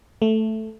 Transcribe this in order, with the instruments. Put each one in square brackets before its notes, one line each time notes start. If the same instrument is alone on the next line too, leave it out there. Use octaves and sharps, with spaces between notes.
[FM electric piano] A3